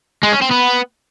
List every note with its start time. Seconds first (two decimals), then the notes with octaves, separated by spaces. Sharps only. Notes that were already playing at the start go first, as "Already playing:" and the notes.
0.23 G#3
0.32 C#4
0.41 C4
0.51 B3